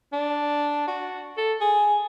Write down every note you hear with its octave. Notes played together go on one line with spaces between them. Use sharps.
D4
F#4
A4
G#4